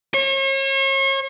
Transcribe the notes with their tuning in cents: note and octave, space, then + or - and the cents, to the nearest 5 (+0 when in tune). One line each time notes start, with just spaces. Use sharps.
C#5 -40